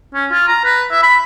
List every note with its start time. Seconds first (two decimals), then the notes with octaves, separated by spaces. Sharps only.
0.14 C#4
0.31 F4
0.48 A#5
0.65 B4
0.91 E5
1.03 B5